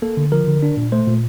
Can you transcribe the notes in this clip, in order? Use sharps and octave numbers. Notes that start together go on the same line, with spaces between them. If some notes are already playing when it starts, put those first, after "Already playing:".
A#3 A4
D3
F3 A#4
D3
D4
A#2
A3 C5
A#2